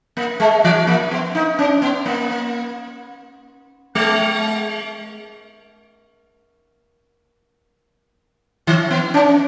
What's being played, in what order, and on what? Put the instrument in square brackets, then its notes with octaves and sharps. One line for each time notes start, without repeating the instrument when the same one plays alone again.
[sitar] A#3
G#3
E3
A#3
B3
D#4
C#4
B3
A#3
G#3
D#3
B3
C#4